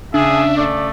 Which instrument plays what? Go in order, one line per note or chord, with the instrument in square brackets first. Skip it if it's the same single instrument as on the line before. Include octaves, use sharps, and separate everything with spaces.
[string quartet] C#3 [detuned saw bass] D4 [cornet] G#4 [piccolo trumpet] E5
[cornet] A3 [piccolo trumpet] D5